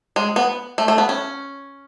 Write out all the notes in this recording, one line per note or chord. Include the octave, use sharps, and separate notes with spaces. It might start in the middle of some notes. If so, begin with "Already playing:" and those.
G#3
B3
A3
A3
B3
C#4